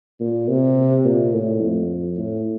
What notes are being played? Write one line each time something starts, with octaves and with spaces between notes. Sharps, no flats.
A#2
C3
A#2
A2
F2
A2